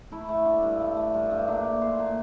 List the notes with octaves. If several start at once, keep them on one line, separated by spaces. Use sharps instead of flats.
A3 E4
A3
D3
G2
A3
A3
G2
G2
A#2 D4
A3
A#2 C5
A#2